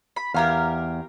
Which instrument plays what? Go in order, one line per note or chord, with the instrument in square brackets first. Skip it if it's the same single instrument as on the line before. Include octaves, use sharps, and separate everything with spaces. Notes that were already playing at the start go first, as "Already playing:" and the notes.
[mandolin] B5
[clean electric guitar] E2 [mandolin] G4 A#4 F5